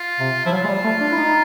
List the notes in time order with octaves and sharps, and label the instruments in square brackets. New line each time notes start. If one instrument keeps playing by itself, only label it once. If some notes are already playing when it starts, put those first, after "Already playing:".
Already playing: [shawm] F4
[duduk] C3
[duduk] F3 [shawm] E4
[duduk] F#3 [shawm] F4
[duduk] G#3
G3
A3
D4
E4
D#4